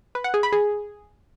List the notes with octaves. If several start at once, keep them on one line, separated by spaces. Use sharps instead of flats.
B4
F#5
G#4
B5
G#4